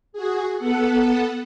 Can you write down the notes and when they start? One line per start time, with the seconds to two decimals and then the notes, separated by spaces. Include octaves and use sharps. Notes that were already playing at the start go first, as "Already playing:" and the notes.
0.13 F#4 G#4
0.58 B3 A4 F#5